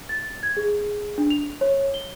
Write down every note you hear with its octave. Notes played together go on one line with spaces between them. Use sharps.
A6
G#6
G#4
D4
F7
C#5
G7